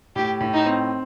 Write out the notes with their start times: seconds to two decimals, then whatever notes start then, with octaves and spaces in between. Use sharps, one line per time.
0.16 A2 G4
0.40 A2
0.54 D#4
0.66 C4